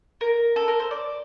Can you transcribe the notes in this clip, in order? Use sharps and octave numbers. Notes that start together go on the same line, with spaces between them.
A#4
A4
A#4
C5
D5